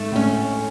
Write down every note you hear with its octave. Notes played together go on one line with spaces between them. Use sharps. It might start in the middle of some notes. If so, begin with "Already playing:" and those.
Already playing: G#2 A3
A2
C#4